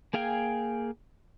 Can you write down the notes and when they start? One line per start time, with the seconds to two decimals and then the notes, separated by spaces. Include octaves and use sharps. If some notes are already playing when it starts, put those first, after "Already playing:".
0.14 A#3 G#4 F5 G5 G#5